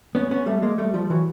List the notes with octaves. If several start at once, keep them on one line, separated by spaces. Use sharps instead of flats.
B3 C#4
B3 C#4
G3 A3
G#3 A#3
G3 A3
F3 G3
E3 F#3